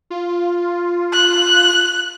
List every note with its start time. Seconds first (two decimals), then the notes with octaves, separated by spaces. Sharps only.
0.10 F4
1.13 F#6